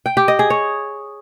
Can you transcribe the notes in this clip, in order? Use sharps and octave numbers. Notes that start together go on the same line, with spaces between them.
G5
G4
D#5
G#4
C#5